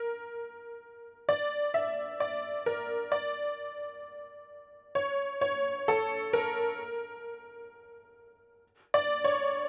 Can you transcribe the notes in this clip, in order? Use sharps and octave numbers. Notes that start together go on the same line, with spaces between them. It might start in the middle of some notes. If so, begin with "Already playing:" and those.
Already playing: A#4
D5
E5
D5
A#4
D5
C#5
C#5
A4
A#4
D5
C#5